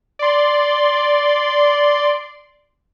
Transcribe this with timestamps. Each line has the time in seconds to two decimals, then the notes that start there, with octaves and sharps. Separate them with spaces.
0.19 D5 C6